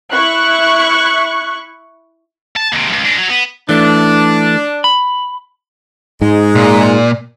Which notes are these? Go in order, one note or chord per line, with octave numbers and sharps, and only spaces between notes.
E4 C#6 F#6
A5
D#2 C3
C#2 F#2
G#3 D4
F#3
B3
E3 A3 D4
B5
G#2 G#3
A#2